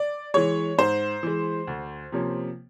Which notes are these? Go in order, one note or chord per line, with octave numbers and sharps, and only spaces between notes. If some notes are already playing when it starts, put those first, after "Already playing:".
Already playing: D5
E3 G#3 C#5
G#2 C5
E3 G#3
D2
C3 F3 A#3 C#4